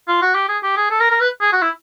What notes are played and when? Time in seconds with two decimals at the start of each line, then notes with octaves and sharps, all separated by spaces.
0.08 F4
0.22 F#4
0.35 G4
0.49 G#4
0.63 G4
0.77 G#4
0.91 A4
1.00 A#4
1.11 A#4
1.21 B4
1.41 G#4
1.53 F#4
1.62 E4